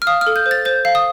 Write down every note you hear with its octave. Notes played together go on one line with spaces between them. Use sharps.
F6
F5 D#6
F6
A4
G6
C5
A6
C5 G6
F5
D#6